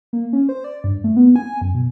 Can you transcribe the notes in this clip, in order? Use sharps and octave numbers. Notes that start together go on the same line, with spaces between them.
A#3
C#4
C5
D5
G2
A3
B3
G#5
F#2
B2